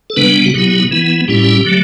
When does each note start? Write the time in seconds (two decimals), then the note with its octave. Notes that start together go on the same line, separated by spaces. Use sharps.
0.10 A4
0.16 C#3 G3 B3 D4 B4
0.46 F#4
0.54 B2 F#3 B3 E4 G4
0.91 E3 B3 E4
1.28 A2 G3 C#4 E4 G4
1.65 D3 F#3 A3